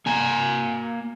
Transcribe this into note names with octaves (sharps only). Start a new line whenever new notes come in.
A#3 G#5 A#5